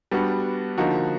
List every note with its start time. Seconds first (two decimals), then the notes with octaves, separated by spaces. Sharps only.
0.11 G3 B3 D4 F#4
0.78 D3 F3 A#3 D#4 F#4